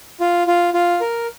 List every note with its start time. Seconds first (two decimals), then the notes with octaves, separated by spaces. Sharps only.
0.20 F4
0.47 F4
0.74 F4
1.01 A#4